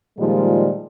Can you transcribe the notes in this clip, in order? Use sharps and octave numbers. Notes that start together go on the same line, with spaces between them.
A#2 D#3 F3 G3 G#3